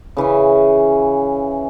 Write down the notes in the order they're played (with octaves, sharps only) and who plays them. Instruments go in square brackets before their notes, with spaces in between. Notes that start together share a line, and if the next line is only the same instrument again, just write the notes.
[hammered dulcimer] C#3 E3 C#4